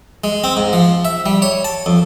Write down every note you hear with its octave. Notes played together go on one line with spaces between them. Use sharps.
G#3
C4
G#2
F3
E5
G3
C#5
A5
F2